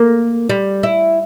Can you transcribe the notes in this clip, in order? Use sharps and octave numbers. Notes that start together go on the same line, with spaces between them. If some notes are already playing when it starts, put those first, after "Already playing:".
Already playing: A#3
G3
E4